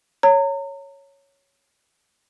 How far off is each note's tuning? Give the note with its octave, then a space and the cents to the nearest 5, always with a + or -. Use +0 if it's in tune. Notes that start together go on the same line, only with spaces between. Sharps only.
C#5 +0 A#5 -35